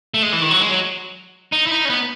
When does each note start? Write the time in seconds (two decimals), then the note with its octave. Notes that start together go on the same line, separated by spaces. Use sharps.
0.14 A3
0.23 G#3
0.33 E3
0.42 D#3
0.51 F#3
0.60 G#3
0.69 F#3
1.52 D#4
1.67 E4
1.71 D#4
1.85 C#4
1.90 B3